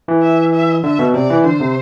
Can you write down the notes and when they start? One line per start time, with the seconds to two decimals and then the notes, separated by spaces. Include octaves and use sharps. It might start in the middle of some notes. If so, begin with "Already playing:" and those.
0.08 E3
0.23 E5
0.53 E5
0.83 D3 E5
0.99 B2
1.14 C3 D5
1.30 E3
1.44 D3 C5
1.61 C3